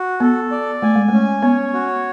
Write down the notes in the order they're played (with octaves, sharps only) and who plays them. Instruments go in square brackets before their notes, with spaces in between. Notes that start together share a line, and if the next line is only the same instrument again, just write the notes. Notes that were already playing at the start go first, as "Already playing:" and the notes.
Already playing: [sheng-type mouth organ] F#4
[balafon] B3 [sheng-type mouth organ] A4
[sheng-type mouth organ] D5
[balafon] A3 [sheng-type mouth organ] G#5
[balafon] G#3
[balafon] A3 [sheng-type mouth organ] C#4
[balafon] B3 [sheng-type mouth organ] C#5
[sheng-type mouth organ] F#4